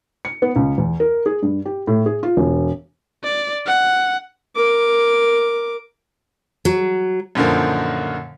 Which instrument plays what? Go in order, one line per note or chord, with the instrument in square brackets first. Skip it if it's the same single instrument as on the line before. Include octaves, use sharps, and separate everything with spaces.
[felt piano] C#7
B3
C#2
E2
A#4
G#4
G2
G4
A2
G#4
F4
E1
[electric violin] D5
F#5
[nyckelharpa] A#4 D6
[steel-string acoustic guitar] F#3
[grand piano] F#2 A#2 D3 D#3 F3